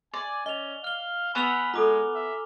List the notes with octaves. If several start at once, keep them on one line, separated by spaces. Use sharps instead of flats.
D5 G#5
C#4 D#5 F7 G7
F5 F6 G7
B3 F#5 G#5 B5 C#6 E6 F7
G#3 F4 A4 A#5 D6
E5